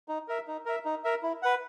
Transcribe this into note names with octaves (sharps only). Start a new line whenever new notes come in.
D#4
A#4 E5
D#4
A#4 E5
D#4
A#4 E5
E4
B4 F#5